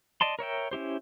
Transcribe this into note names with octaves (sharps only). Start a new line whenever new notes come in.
D5 D#5 A5 C6
A#4 C#5 E5 G5
C#4 E4 G4 C5